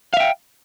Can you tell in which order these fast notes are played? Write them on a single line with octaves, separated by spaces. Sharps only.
F5 E5 G5